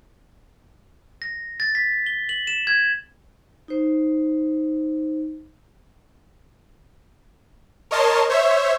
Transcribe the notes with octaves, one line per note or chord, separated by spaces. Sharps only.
A#6
A6
B6
G7
F#7
E7
G#6
D#4 C5
A#4 C#5 D#5 A5 C6
C5 C#5 E5